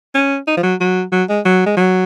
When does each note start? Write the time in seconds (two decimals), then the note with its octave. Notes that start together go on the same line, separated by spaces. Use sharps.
0.15 C#4
0.48 D#4
0.57 F3
0.63 F#3
0.80 F#3
1.12 F#3
1.29 G#3
1.45 F#3
1.66 G#3
1.77 F#3